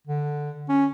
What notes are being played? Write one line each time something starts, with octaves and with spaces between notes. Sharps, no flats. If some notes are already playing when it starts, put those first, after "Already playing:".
D3
C#4